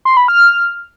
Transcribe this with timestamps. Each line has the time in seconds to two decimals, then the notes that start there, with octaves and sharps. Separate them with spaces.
0.05 C6
0.17 B5
0.28 F6